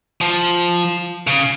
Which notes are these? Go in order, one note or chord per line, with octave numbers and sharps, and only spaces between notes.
F3
C#3